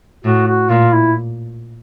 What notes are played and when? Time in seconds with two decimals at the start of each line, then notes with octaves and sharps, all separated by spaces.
0.25 A2 F#4
0.48 F#4
0.69 A#2 F4
0.93 E4